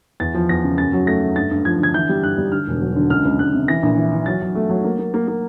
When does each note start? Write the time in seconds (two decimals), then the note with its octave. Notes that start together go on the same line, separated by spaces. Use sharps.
0.20 E2 A6
0.34 F3
0.49 E2 A#6
0.64 C#3
0.78 F#2 A6
0.93 F#3
1.07 A3 A#6
1.21 A3
1.36 G2 A6
1.51 G2
1.65 F3 G#6
1.80 D3 G#6
1.94 E3 G6
2.09 G3
2.23 G2 F#6
2.38 G3
2.52 D3 F6
2.67 E1
2.81 F#3
2.96 D3
3.10 C#2 F6
3.25 C#2
3.39 C#2 F#6
3.54 C3
3.68 E3 A#6
3.83 A#1
3.97 E3
4.13 E3
4.26 F#3 A6
4.42 F#3
4.55 A3
4.69 F#3
4.84 A#3
4.99 A#3
5.14 A#3
5.28 A#3